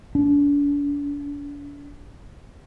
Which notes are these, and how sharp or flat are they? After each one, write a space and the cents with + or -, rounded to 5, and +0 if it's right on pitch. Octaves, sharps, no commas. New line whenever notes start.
D4 -40